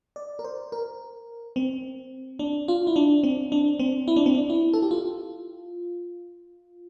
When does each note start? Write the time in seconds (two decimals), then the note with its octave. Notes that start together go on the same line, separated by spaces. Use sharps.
0.16 D5
0.39 A#4
0.44 C5
0.72 A#4
1.56 C4
2.39 D4
2.68 F4
2.87 E4
2.96 D4
3.23 C4
3.52 D4
3.79 C4
4.08 E4
4.16 D4
4.26 C4
4.35 D4
4.50 E4
4.73 A4
4.82 G4
4.91 F4